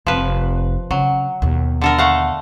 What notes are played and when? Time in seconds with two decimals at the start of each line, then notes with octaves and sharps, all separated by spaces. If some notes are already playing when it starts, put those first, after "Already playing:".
0.07 F1 F3 B4
0.91 C#3 F#3
1.42 D#2 B2
1.81 D3 A4 A#4
1.98 A3 F5 F#5